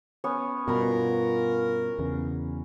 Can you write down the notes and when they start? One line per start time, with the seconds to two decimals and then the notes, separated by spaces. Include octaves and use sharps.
0.24 B3 C#4 C#5
0.68 G2 B2 F4 F#4 A#4 A#5 B5
1.99 E2 C#3